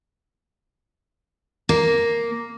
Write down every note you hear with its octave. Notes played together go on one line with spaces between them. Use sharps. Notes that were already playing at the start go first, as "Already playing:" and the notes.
A#3